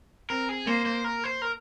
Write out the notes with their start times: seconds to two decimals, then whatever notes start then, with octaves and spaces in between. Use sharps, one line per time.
0.30 C4 A#4
0.49 G#4
0.66 A#3 C5
0.86 C5
1.04 A#4
1.24 C5
1.42 A#4